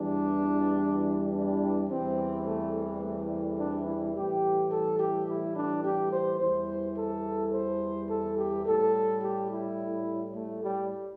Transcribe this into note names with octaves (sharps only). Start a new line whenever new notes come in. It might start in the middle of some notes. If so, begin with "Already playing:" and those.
Already playing: E2 E3 G3 D4
D4
E2 C3 E3 G3 C4
A3
A3
D4
E4
A2 E3 G3 G4
A4
G4
E4
D4
G4
C5
E2 E3 G3 C5
A4
C5
A4
G4
A2 G3 A4
G4
E4
A3
G3